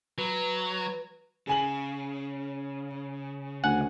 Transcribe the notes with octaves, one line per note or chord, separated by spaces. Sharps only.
F#3 B4
C#3 G#4 G#5 F#7
D2 F#5 G#5